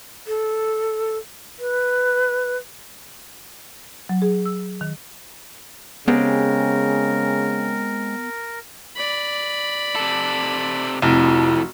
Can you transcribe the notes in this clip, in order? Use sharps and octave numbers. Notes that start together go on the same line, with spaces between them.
A4
B4
F#3
G#4
E6
D#3
C#3 G#3 B3 C4 G4 A#4
D5 B5
C3 A4
F1 F2 E4 F#4